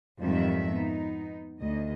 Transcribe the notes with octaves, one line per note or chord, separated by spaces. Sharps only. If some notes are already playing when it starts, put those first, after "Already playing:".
F2 G#2 D#3 F#3 G3 E5
B3 D#4
D2 D#5